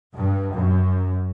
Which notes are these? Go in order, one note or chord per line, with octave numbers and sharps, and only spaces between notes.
G2
F#2